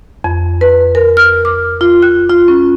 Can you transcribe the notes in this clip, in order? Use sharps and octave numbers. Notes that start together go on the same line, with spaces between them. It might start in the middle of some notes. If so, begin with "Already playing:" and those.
F2
B4
A#4
F6
D6
F4
F#6
F4
C#4